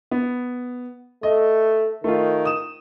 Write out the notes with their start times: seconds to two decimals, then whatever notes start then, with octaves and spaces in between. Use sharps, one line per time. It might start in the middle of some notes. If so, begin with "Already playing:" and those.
0.11 B3
1.23 A3 D#5
2.04 D#3 A3 F4
2.45 D#6 E7